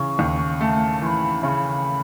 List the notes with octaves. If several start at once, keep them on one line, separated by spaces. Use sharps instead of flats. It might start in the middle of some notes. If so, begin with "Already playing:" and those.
Already playing: C#3 E3 C#6
D#2
A3 A5
E3 C#6
B5
C#3 C#6
B5